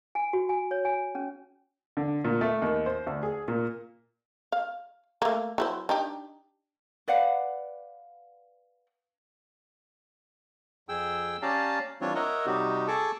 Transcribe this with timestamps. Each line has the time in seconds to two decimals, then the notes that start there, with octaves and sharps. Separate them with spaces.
0.15 G#5
0.33 F#4
0.49 G#5
0.71 C#5
0.85 G#5
1.15 C#4
1.97 D3
2.24 A#2
2.41 A3
2.62 D#2
2.86 C5
3.06 D2
3.23 G#4
3.48 A#2
4.52 F5
5.22 A3 A#3
5.58 F#3 E4 C5
5.89 D4 D#4 G4
7.08 B4 D5 F5 F#5
10.89 F2 G#4 G5 E6
11.42 C#4 G4 D5 F5 A5 A#5
12.01 E3 G3 C4 D4 F4 C#5
12.15 A#4 C#5 D#5 E5 F#5 A#5
12.46 C3 G3 D#4 F#4 G4
12.88 G#4 A4 A5 C#6 D6